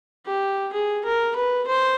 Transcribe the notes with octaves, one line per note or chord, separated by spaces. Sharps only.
G4
G#4
A#4
B4
C5